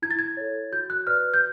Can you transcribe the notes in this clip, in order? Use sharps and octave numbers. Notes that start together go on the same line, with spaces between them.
E4 G#6
A6
G#6
A4 C#5
F#4 G6
F#6
B4 D5 F6
G6